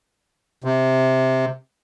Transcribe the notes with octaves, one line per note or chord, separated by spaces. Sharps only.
C3